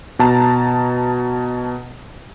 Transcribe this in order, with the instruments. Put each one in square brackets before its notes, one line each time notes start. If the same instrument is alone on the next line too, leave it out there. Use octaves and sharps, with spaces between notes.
[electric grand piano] B2 A5 A#5